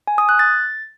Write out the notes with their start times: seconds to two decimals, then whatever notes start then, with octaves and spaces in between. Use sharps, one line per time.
0.07 G#5
0.18 D#6
0.29 F#6
0.39 A6